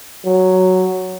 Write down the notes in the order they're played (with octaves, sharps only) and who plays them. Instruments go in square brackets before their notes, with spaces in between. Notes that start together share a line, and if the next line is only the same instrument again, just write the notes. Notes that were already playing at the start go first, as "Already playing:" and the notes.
[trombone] F#3